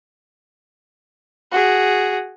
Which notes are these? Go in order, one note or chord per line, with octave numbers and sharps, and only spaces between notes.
F#4 G#4